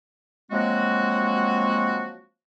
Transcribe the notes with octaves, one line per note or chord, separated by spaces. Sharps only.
F3 F#3 G#3 A#3 C4 F#4